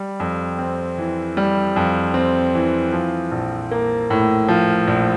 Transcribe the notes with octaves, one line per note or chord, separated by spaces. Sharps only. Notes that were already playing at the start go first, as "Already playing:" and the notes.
Already playing: G3
F2
C4
E3
G3
F2
C4
E3
F3
A#1
A#3
A2
F3
A#1